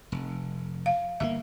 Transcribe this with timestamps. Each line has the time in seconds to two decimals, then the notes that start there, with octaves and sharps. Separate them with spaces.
0.12 F1
0.86 F5
1.20 G1 C3 A#3 E5